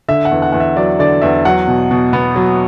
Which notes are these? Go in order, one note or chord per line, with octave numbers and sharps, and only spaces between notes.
D3 E5
F#5
E2
F#5
E2 F#5
E5
F#3 D5
D3 D5
E2 E5
F#3 F#5
B2
B2
B3
F#3